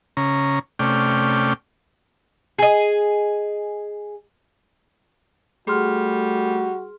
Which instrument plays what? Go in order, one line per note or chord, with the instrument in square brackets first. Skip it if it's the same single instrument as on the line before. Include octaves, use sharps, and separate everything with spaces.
[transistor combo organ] C#3 C#4 A#5
C3 A3 C#4 D5 G5 F6
[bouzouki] G#4 D#5
[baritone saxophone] G3 [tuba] A3 [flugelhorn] F#4 [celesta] G#4 C6 F6